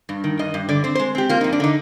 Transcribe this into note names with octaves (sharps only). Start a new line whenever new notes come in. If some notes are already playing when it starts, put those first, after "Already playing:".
G2
D#3
G2 D#5
G2
D3 D5
C4 C5
G#3 C5
C4 G4
A#3 F4
F2 D#4
D4
D3 D#4